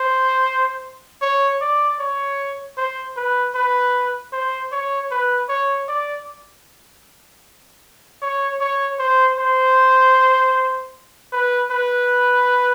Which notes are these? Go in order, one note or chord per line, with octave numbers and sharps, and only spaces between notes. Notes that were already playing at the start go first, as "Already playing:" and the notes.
Already playing: C5
C#5
D5
C#5
C5
B4
B4
C5
C#5
B4
C#5
D5
C#5
C#5
C5
C5
B4
B4